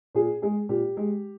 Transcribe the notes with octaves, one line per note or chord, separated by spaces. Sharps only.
A#2 G#4
G#3 G#4
A#2 G4
G#3